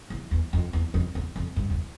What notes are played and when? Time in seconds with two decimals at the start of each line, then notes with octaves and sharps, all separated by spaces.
0.10 E2
0.31 E2
0.53 F2
0.73 E2
0.94 F2
1.15 E2
1.36 F2
1.56 G2
1.70 E2